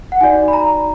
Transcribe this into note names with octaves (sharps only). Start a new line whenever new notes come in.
F#5
D#4 F#4 D5 G#5
B5
A#5